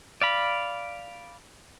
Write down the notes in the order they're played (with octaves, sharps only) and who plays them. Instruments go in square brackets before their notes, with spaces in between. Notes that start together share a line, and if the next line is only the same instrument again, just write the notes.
[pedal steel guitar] D5 F5 B5